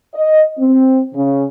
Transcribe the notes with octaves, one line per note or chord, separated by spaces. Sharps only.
D#5
C4
C#3